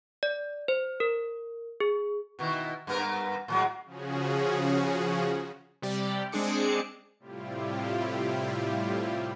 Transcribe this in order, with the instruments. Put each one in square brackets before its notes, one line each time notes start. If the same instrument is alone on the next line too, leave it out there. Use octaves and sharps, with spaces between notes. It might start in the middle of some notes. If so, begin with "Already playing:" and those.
[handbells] D5
C5
A#4
G#4
[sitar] B2 D#3 E4
G2 B3 A#4
A2 F#3 G#3
[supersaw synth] C#3 F3 C#4 F#4 G#4
[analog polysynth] C3 G3 G4 D5
G#3 C4 D4 G#4 D6 C#7
[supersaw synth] A2 C3 G3 E4 F4 G4